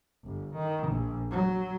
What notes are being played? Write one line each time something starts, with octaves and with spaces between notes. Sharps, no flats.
G1
D#3
A#1
F#3